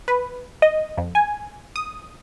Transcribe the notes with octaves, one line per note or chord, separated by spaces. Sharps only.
B4
D#5
F2
G#5
D#6